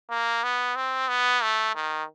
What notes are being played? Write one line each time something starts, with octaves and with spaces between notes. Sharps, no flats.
A#3
B3
C4
B3
A3
D#3